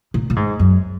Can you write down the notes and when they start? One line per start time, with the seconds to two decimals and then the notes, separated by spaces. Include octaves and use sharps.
0.14 A#2
0.30 A#2
0.36 G#2
0.59 F#2